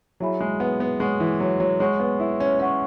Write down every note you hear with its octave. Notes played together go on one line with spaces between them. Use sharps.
F#3 E4 G#4 E5 G#5 B5
G#3
B3
B3
G#3 C#5 F#5 C#6
E3
F#3
F#3
G#3 C#5 F#5 C#6
B3
E4
C#4
C#4 C#5 F#5 C#6